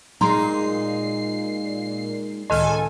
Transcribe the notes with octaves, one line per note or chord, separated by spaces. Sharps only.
A#2 G#3 D#4 A#5 C6 C7
C#2 A2 D#3 A4 D#5 G#5 F6